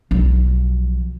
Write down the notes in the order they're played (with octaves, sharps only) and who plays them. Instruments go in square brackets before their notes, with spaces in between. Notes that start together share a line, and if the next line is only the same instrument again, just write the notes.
[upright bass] B1 F3